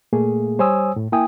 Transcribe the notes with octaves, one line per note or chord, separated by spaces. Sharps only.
A#2 A3 A#3 G#4
G3 C5 C#5 G#5 D#6 E6
A2
A#3 E4 G5 G#5 D#6